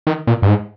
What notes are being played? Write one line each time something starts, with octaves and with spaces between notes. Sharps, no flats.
D#3
A#2
G2
G#2